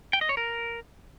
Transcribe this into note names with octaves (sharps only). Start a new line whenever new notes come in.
G5
D#5
C#5
A#4